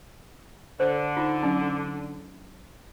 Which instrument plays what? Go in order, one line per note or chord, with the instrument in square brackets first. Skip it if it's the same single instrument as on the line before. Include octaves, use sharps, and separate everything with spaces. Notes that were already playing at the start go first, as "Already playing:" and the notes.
[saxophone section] D3 [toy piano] C5
[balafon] D#4 [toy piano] F4
[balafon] F#3 C#4 D4